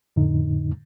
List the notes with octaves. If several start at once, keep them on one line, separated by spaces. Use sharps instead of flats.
F2 A2 D3 D#4